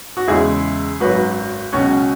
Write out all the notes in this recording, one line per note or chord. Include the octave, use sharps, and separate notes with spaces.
F#4
E2 C#3 G#3 E4 G#4
G#1 F#2 F#3 F#4 B4
C#2 B2 F#3 C#4 F#4